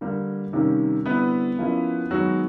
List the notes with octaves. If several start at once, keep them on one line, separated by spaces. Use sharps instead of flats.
D3 G3 A#3
C3 D#3 G3 A#3 C#4
D3 G3 B3 C4 E4 B4
F3 A#3 C#4 E4
D#3 F#3 G#3 B3 F#4